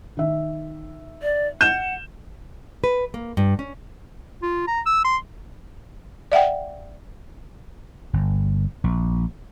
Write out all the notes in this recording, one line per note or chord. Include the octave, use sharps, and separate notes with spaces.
D#3 E5
D5
F#5 G6 E7
B4
A#3
G2
C#4
F4
A#5
E6
C6
D5 E5 F#5 G5
G1
A#1